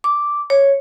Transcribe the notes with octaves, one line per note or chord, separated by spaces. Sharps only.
D6
C#5